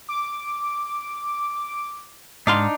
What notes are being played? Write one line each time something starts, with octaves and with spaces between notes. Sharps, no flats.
D6
G#2 D4 D#4 F5 C6